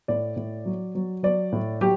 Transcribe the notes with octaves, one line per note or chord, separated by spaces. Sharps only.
A2 D5
A2
F#3
F#3
F#3 D5
A2
F#3 G4